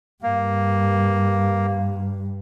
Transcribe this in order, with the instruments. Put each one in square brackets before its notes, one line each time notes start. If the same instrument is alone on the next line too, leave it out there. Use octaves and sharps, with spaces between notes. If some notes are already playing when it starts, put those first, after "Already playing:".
[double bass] G2 [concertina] A#3